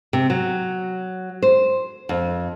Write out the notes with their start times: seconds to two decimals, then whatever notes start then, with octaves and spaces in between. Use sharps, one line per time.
0.13 C3
0.30 F#3
1.42 C5
2.09 F2